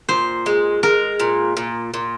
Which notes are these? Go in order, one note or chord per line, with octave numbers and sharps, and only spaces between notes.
A#2 C5
G#3
G#3 A#4
A#2
A#2
A#2